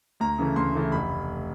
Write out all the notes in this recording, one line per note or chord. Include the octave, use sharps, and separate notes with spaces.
D2 A#5
C#3 E3 A3
D2 C6
C#3 E3 A3
F1 B5